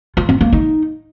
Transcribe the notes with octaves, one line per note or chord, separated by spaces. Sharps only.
F4
C4
A#3
D#4